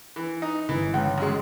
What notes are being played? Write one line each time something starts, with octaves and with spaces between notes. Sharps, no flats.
E3
D#4
G1 C#3 E3
C#2
F#2 G#3